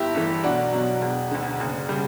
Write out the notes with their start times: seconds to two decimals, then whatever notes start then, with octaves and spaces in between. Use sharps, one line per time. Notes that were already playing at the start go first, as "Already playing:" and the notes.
Already playing: G1 E4 G4
0.15 G2 E3 A3
0.44 B1 D4 F#4
0.72 B2 F#3
1.02 E1
1.31 D2 D3
1.60 F#1
1.89 C#3 G3